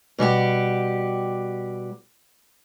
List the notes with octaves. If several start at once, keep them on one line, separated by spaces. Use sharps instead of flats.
B2 G3 F#4 G4